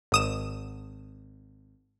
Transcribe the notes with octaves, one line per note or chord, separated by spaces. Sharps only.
G#1 D#6 E7